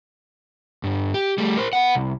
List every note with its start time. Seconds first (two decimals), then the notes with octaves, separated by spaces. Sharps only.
0.84 G2 D3
1.14 G4
1.38 G3 A3
1.57 A#4 C5
1.73 B3 F#5
1.95 C2